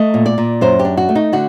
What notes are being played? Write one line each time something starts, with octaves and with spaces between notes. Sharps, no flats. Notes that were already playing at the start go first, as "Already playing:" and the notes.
Already playing: A3 D#5
A#2
D5
A#2
F#2 C5
G4
D4
F#4
A3
D#4
D3 F#4